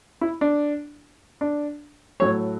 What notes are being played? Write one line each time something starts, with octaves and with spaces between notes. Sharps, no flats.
E4
D4
D4
A2 F#3 A3 C#5